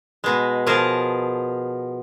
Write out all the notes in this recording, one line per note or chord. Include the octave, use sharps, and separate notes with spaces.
B2 G#3
B2 F3 G#4 A#4 A5